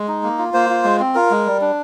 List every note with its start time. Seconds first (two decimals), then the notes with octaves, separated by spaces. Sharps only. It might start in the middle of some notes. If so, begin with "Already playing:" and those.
Already playing: G#3
0.08 D#4
0.23 A#3
0.38 F4
0.54 A#3 C5
0.70 F4
0.85 G#3
1.00 C4
1.15 F4 A#4
1.31 G#3
1.46 G3
1.61 D4